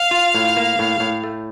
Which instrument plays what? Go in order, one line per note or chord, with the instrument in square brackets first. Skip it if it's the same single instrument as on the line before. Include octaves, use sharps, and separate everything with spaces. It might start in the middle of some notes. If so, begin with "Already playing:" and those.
Already playing: [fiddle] F5
[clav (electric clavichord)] F4
A2
A#3
A2
A2
A3